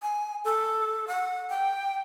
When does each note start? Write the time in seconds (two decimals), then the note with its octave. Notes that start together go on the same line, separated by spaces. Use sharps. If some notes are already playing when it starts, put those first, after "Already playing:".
0.02 G#5
0.45 A4
1.08 F#5
1.50 G5